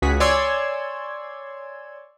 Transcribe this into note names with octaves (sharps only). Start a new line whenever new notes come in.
C#2 F#4 G#4 B6
C#5 D5 G#5 C6 E6 G#6